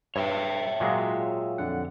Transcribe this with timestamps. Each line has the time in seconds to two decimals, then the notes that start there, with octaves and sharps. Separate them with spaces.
0.16 G2 C#5 E5 G5
0.80 A#2 F#3 G#3 F4 G#4
1.58 F2 D3 F#5